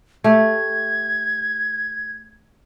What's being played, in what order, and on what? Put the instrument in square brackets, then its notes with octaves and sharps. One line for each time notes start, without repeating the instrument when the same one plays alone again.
[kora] A3 G4 [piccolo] G#6